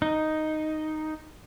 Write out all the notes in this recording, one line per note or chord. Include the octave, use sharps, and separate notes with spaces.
D#4